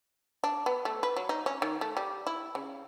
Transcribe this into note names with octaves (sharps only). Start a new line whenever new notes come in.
D4
B3
A3
B4
F#3
D#4
C#4
D#3
A3
G3
E4
C#3